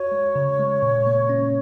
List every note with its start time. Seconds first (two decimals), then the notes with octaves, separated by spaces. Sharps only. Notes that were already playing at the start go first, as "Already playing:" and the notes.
Already playing: F#4 C#5
0.12 G#3
0.35 C#3
0.59 G#3
0.82 A#2
1.07 A#3
1.29 C#4